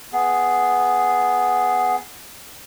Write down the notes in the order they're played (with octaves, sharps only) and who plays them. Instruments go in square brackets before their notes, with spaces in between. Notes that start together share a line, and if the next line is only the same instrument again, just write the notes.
[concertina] B3 G#4